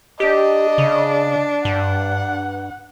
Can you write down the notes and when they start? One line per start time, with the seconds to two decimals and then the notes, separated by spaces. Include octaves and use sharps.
0.20 D4 G4 D#5
0.78 C#3
1.65 G2 F#5